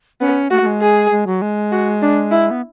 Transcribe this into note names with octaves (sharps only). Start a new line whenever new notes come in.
B3 C#4
A3 F#4
A3
G#3
G#4
G#3
F#3
G#3
F#4
D4
E4
B3